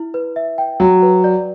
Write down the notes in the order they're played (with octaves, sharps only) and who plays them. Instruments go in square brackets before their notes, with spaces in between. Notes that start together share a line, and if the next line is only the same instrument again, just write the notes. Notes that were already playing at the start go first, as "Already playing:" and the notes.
Already playing: [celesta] E4
B4
E5
G5
[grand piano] F#3 [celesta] F#4
[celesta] B4
D5